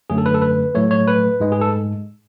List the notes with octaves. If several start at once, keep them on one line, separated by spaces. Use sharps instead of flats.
F#2 D3 F#3 A3 G#4
A4
B4
A4
B4
A2 F#3 A3 C#5
C#5
B4
G#2 G#3
G#4
A4